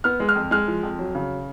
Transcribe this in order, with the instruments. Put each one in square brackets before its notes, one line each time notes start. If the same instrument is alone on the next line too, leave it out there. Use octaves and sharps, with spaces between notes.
[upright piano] B3 F6
G#3
F6
F2
G#3 F6
F3
F2
F#3
C#3